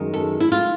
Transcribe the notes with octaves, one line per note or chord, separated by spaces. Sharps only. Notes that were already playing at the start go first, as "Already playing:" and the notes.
Already playing: F#2 D#3 G#3
A4
E4
F4